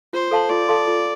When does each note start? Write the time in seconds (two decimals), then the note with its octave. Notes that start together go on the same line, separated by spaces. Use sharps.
0.13 F4 C5
0.31 A4 F5 A5 C6
0.50 F4 D5
0.68 A4 F5 A5 C6
0.87 F4